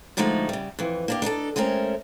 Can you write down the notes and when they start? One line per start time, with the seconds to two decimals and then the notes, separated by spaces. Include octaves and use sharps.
0.17 D3 F3 G#3 A3 D#4 F#4
0.49 C#3 G3
0.79 F2 E3
1.08 A#3 D4 G4
1.22 D4 D#4 G4 A4
1.56 G#3 A3 C4 C#4 A#4